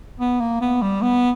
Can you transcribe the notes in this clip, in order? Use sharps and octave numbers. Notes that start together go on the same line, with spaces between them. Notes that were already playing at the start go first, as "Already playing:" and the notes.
B3
A#3
B3
G3
B3